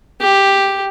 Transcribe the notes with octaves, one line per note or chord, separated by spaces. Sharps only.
G4